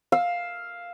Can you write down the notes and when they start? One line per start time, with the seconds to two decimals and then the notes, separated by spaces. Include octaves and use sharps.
0.12 F5 E6